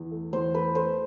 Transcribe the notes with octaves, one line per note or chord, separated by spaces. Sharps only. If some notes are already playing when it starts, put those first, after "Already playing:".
Already playing: E2
A3
E2 C5
A3 B4
A3 C5